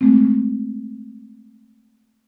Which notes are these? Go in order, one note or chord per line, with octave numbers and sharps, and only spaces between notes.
G#3 A3 C4